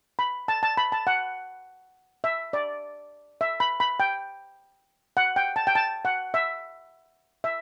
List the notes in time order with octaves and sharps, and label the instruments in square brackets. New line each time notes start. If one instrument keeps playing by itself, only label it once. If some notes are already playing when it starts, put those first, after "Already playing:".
[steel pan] B5
A5
A5
B5
A5
F#5
E5
D5
E5
B5
B5
G5
F#5
G5
A5
G5
A5
F#5
E5
E5